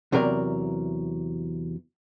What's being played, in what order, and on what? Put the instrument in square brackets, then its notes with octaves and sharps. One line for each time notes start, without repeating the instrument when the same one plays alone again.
[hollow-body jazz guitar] E2 C3 F#3 A#4 D5